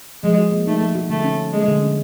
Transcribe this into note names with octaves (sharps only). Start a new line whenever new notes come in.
F3 G#3
F#4
A#3
A3 D#4
F3
F#4
D3 A3
C#4
F3
G#3 A#3
D3
C#4